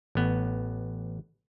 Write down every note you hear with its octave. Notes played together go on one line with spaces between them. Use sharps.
A1 B3